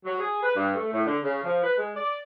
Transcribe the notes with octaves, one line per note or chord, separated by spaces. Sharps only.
F#3
G#4
B4
G2
A3
A2
D3
C#3
F3
B4
G#3
D5